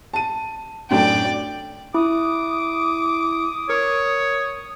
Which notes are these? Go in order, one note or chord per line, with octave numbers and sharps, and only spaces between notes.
A5 D#7
F#2 A2 D4 D5 G5
E4 D6 D#6
A#4 C#5